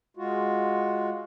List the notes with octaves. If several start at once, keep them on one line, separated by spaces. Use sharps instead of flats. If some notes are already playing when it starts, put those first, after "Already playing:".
G#3 F4 F#4